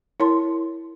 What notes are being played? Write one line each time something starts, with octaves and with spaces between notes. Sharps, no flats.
E4 A#4 C#5 A5 C6